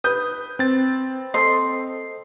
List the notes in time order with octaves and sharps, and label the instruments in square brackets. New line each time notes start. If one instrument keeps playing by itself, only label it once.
[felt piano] B4 G6 [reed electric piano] D#6
[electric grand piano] C4 A6
[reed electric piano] A4 C5 D#5 [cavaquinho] C6